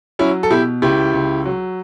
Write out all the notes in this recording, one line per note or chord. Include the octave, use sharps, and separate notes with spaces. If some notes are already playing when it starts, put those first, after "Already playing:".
F#3 C#4 E4
A4
B2 E4 G4
C#2 E4 G4
C#2
F#3